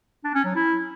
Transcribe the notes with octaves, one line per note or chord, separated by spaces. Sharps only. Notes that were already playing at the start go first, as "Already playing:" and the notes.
D4
C#4
F#3
E4